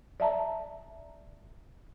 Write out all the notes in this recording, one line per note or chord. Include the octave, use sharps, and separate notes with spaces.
D5 E5 A5 A#5